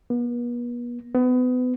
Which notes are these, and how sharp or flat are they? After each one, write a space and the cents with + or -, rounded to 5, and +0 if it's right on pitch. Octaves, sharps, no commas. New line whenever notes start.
B3 -40
B3 +30